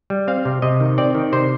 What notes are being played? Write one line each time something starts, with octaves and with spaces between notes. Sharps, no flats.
G3
C4 F5
C3
C3 D#5
D#3
C4 D5
D#3
C3 C5